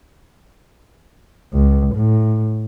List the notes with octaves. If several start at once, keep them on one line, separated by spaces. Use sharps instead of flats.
C#2
A2